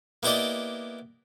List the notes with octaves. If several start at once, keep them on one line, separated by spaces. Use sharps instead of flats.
A#3 B3 E4 G4 D5 D#5